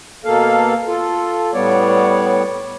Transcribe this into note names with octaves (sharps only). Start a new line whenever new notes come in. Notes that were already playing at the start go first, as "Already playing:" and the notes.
B2 A#3 A4 F5
F4 A4
A2 G3 B3 C#5 D5